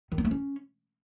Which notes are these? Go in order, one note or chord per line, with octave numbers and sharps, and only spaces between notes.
D#3
B3
A3
C#4